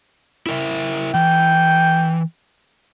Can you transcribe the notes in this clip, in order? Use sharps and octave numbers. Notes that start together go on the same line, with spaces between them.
E4 A#4 E5
E3 G5